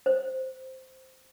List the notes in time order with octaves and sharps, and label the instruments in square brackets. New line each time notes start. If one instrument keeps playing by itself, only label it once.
[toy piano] C5